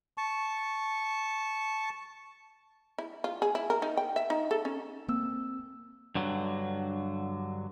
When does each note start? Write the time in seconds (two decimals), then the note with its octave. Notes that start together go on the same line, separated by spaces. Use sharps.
0.18 A5 C#6
2.98 E4
3.24 F4
3.42 G#4
3.55 E4
3.70 A#4
3.82 D#4
3.97 G5
4.16 E5
4.30 D#4
4.51 A4
4.65 C#4
5.08 A#3 C4 E6
6.15 G2 D3 F#3